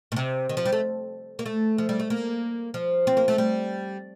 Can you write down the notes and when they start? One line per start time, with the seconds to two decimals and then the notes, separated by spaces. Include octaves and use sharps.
0.12 A#2
0.16 C3
0.49 D#3
0.57 F3
0.65 G3
0.72 A3
1.39 A#3
1.46 A3
1.78 F3
1.89 G3
2.00 A3
2.10 A#3
2.74 F3
3.07 C4
3.17 A#3
3.28 A3
3.38 G3